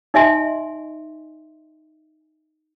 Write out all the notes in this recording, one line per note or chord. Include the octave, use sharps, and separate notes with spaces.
D#4 D#5 E5 G#5 C6